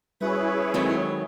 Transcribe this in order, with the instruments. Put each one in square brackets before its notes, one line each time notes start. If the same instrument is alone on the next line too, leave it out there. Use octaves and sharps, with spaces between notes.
[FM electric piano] G3 C#4 F#4 [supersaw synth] E4 G#4 C#5 [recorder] B4
[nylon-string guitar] D#3 F#3 C4 [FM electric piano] G#3 A4